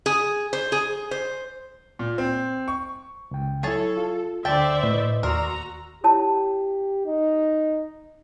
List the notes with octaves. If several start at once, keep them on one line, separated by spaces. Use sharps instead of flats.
G#4
C5
G#4
C5
A#2
C4
C#6
C#2 G5
F#3 E4 G#4 A4 C#5 A5
F4
D2 D3 C5 D5 E5 G5 A5
A2 B4 D#5
D#2 F#4 A#4 D5 A#5 C6 E6
E4 G4 C#5 A5
D#4